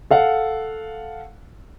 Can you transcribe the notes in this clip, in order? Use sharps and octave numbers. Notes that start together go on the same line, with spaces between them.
A4 F5 F#5